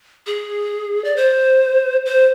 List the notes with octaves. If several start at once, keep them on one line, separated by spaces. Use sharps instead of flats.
G#4
D5
C5
C5